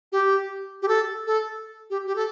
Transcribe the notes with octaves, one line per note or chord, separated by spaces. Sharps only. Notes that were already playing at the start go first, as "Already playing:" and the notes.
G4
G4
A4
A4
G4
G4
A4